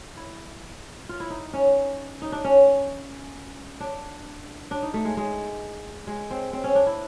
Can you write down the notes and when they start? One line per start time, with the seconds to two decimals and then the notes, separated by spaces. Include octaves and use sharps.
0.17 E4
1.09 F4
1.20 E4
1.30 D#4
1.53 C#4
2.22 D#4
2.32 D4
2.44 C#4
3.80 D4
4.71 D4
4.82 D#4
4.94 A3
5.05 G#3
5.17 G#3
6.07 G#3
6.31 C4
6.53 C4
6.64 C#4
6.75 D4
6.86 E4